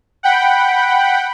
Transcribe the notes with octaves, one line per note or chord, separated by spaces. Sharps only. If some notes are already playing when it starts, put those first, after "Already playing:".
F#5 G5 B5